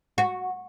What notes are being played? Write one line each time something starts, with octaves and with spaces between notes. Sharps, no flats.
F#4